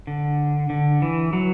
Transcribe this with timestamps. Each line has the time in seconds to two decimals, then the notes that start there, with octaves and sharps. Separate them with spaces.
0.07 D3
0.70 D3
1.02 E3
1.33 F#3